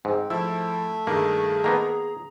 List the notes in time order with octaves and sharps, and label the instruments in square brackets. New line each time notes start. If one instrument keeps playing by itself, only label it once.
[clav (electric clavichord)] G#2 [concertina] C4
[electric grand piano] F3 E4 E6 [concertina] A3 E5
[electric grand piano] G2 D#3 [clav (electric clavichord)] A#3 [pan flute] G#4
[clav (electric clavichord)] D#3 A#3 B3 [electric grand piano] A#5